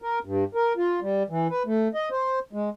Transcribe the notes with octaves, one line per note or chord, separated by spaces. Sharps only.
A#4
G2
A#4
F4
G3
E3
B4
A3
D#5
C5
G#3